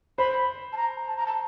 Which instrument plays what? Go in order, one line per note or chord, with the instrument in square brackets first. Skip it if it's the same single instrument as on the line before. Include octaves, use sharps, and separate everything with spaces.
[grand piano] C5 [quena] B5
[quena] A5
A#5
A5
A#5
A5